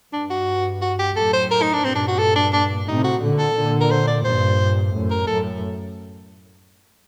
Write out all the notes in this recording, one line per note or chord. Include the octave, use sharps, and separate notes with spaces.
G2 D4
F#4
F#4
G4
F#2 A2 A4
C5
A#4
D#4
D4
G2 A#2 C4
D4
F#4
A4
D4
D4
A2 C3 D#4
F#4
A#2 D3
A4
A#2 D3
A#4
C5
D5
G2 A#2 C5
F#2 A2
A#4
F#2 A2 A4